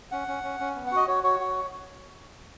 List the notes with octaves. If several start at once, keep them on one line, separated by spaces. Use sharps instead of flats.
C#4 F#5
C#4
C#4
C#4
B3
F#5
F#4 D#5
F#4 C#5
F#4 C#5
F#4